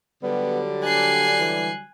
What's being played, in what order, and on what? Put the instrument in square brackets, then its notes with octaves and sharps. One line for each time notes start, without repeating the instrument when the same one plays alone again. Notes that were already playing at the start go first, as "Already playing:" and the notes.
[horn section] D3 F#3 G3 [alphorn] B3
[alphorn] D4 [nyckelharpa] G#5 [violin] F#6 C7
[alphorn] E3